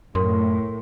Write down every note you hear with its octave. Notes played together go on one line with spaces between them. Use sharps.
F#2 A2 A#4 C6